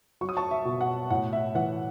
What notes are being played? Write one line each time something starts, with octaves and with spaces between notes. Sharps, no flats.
F#3 C#6
D#6
A5 C#6
E5
B2
F#5
A2 F#5
E5
E3 F#5